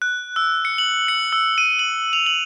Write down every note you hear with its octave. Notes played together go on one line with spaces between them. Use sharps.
F#6
E6
C#7
F#7
C#7
E6
D#7
F#7
F7
F#7